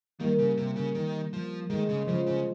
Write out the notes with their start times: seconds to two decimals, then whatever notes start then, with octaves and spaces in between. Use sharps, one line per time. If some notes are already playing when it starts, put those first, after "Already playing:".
0.20 D#3 G3 A#3
0.39 C#3
0.57 C3
0.76 C#3
0.95 D#3
1.33 F3
1.70 D#3 G#3
1.89 C#3
2.07 C#3 F3
2.26 C#3